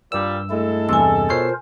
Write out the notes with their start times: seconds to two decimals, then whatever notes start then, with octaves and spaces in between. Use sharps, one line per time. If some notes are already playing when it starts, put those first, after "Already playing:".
0.12 G2 A#2 G3 E6
0.50 G#3 A3 E4 A4
0.89 E2 G2 C3 G#5 E6
1.30 B2 F4 A#4 C5 C#5 C7